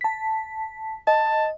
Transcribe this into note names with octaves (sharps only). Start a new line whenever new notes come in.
A5 B6
D#5 A5